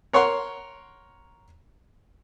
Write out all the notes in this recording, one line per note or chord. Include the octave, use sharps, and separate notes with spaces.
A#4 C#5 F#5 C6